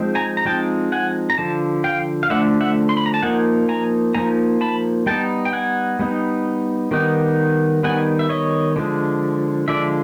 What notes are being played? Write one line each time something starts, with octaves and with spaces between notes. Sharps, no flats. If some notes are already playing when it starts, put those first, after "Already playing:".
Already playing: F3 G#3 C4 D#4
G#5 A#5
A#5
F3 G#3 C4 D#4 G5 A5
F#5 G#5
A#5
D3 F3 A5
F5 G5
F5
D3 F3 A3 D4 E5 F#5
E5 F#5
C6
B5
A#5
A5
F3 A#3 D#4 F#5 G#5
G#5 A#5
F3 A#3 D#4 G#5 A#5
A5 B5
G3 B3 D#4 G5 A5
G5
F#5 G#5
G3 B3 D#4
D#3 G3 B3 D#4
D#3 G3 B3 D#4 F#5 G#5
E5
C#5 D#5
D3 F3 G#3
D3 F3 G#3 D5 E5